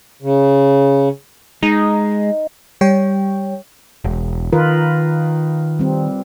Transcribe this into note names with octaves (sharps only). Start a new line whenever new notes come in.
C#3
G#3 D#4
G3 C#5 G5
E1
D#3 F4 A#4 B4
G3 C4